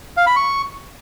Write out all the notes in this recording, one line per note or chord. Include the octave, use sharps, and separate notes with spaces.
F5
B5
C#6